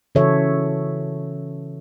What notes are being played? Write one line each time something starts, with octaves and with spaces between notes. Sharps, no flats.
C#3 E3 F#4 A4 C#5 E5